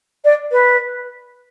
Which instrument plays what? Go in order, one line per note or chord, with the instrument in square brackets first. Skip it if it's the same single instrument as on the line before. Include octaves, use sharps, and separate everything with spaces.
[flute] D5
B4